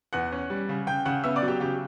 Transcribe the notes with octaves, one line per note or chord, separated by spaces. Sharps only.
E2 F#5 F#6
C#4
G3
C#3
C#3 G5 G6
C#3 F#5 F#6
B3 E5 E6
D5 D6
F#3
G4 G5
C#3 G4 G5